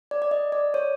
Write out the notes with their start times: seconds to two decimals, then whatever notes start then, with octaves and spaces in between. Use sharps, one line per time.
0.11 D5
0.22 D5
0.31 D#5
0.52 D5
0.74 C#5